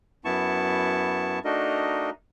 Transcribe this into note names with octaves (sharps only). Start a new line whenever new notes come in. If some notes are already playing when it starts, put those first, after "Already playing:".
F#2 B3 E4 A5 C#6
A3 D4 D#4 F#4 A#4 D#5